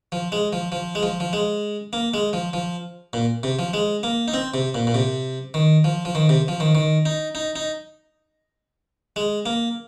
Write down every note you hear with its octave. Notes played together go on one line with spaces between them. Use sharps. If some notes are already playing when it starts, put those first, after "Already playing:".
F3
G#3
F3
F3
G#3
F3
F3
G#3
A#3
G#3
F3
F3
A#2
C3
F3
G#3
A#3
D#4
C4
C3
A#2
A#2
C3
D#3
F3
F3
D#3
C3
F3
D#3
D#3
D#4
D#4
D#4
G#3
A#3